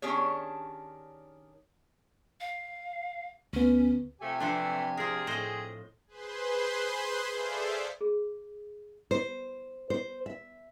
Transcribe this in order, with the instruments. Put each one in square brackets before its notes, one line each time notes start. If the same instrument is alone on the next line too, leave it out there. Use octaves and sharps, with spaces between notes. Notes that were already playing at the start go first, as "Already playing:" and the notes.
[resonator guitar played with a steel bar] D#3 C#4 D4 G4 G#4 C#5
[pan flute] F5
[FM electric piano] D2 B3 [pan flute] C#4
[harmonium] C3 G4 G#5 [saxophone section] F3 A3
[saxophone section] E3 A3 [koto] F3 C4 D4
[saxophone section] C4 G#4 [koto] F4 A#4
[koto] A2 C5 D#5
[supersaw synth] G#4 B4 C5 C6
G#4 A4 C5 D5 E5 F5
[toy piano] G#4
[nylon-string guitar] C5
C5
E5